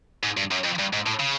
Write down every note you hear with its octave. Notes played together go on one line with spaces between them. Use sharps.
G#2
G2
F#2
F2
G2
G#2
A2
C#3